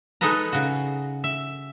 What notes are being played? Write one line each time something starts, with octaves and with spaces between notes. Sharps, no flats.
G#3 D#4 G#4 A4 B4 A#5
C#3 F#4
E5